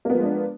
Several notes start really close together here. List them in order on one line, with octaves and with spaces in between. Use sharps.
A#3 B3 F3 G#3 D4